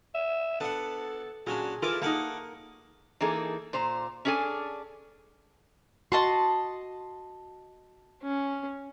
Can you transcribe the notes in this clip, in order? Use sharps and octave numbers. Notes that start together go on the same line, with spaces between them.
E5
B3 D4 A4 F#5
A#2 F#3 C#4 D4 G#4
E3 E4 F4 A4 A#4 D6
A3 A#3 D#4 F#5 D6
E3 A#3 D#4 G#4 A4
A#2 C5 A#5
C#4 D4 G#4 A4 G#5
F#4 D#5 A5 C6
C#4